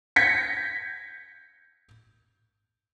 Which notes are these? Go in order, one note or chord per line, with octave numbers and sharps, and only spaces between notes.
G6 G#6 A#6 B6 C#7